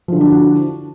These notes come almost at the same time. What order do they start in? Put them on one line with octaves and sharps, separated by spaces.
F3 D3 E4 D4 F#4